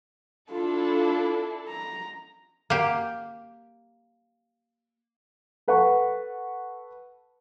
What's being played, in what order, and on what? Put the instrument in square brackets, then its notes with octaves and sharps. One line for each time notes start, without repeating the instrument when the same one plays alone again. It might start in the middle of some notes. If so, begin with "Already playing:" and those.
[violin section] D4 E4 A4 [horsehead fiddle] F4
[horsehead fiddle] A#5
[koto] A#3 G4
[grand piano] A4 B4 F#5 A5 C#6